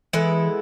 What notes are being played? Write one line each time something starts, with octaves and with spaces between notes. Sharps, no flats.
E3 G#3 B3 E4 A4